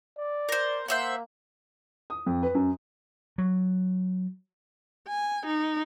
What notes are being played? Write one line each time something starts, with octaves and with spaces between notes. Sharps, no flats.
D5
A#4 C5
A#3 C5 E5 F#5
D#6
F2
B4
F#2
F#3
G#5
D#4